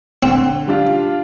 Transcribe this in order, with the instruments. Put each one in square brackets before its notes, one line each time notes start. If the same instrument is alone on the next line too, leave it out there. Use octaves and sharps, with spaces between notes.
[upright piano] D3 [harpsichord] C4
[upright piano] G3 D4 F4